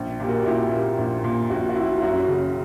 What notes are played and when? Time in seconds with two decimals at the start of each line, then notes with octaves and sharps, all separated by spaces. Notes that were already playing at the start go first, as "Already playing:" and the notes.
Already playing: A#1
0.20 A#2 G4
0.28 F#4 A#4
0.46 A#2 E4 G4
0.72 A#3
0.98 A#1
1.24 A#2
1.50 A#1 F#4
1.69 F#4
1.76 A#1 E4
1.93 E4
2.02 F#2 F#4
2.28 C#3